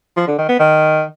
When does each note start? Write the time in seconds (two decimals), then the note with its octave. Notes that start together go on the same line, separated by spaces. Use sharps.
0.17 F3
0.27 D3
0.38 D#3
0.49 B3
0.60 D#3